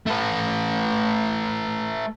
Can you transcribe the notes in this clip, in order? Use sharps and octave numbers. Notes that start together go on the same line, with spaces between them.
A3 B4